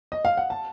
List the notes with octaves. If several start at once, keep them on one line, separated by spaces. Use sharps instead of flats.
D#5
F5
F#5
A5